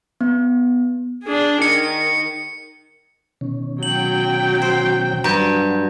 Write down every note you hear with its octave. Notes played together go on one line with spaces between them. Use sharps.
B3
D4 G#4
D#3 C#7
B2 D#3 C#4
F#3 G5 F#7
C5
G2 F#3 F#4 A#5 G6